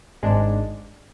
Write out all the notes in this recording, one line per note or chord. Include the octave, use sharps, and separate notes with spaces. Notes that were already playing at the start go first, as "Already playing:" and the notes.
G#1 G#2 G#3 D4